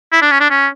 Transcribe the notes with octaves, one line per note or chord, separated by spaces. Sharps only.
E4
D4
C#4
D4
C#4